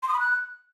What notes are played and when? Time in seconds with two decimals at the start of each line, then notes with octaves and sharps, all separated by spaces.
0.03 C6
0.08 D#6
0.14 B5
0.19 F#6